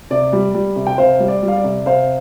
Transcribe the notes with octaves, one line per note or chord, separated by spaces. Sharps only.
C3 D5
G3
G3
C3
G5
C3 C5 F5
G3
D5
G3
F5
D5
C3
C3 C5 F5